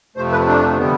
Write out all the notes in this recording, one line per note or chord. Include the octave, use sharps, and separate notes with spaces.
F2 C3 F3 A3 C5
B4
D4
D3 G3 B3